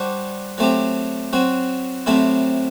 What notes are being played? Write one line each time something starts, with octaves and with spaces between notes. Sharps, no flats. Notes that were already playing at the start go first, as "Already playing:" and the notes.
Already playing: G3 D4 F#4 C5
F#3 A3 C4 G4
F#3 C4 F#4
C3 F#3 A3 C4 E4